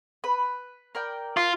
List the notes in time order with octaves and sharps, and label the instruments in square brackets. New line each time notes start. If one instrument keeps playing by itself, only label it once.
[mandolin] B4
A#4 D5 G5
[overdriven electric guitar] F4